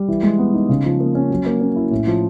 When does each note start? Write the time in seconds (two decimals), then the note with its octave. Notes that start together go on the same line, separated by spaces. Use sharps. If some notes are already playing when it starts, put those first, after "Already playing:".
Already playing: G3
0.08 E3
0.23 G#3
0.38 B3
0.54 D#4
0.69 C#3
0.85 F3
1.00 A#3
1.15 C#4
1.30 F#3
1.46 A#3
1.61 C#4
1.76 E4
1.91 A2
2.07 F3